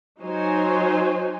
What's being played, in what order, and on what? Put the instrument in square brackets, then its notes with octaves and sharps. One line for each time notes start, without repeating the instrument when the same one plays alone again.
[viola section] F#3 D#4 C5 C#5 G#5